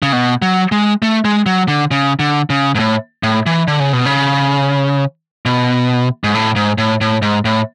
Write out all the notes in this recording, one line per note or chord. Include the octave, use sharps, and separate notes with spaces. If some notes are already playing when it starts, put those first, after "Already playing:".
C#3
B2
F#3
G#3
A3
G#3
F#3
D3
C#3
D3
C#3
G#2
A2
A2
E3
D3
C#3
B2
C#3
B2
G#2
A2
G#2
A2
A2
G#2
A2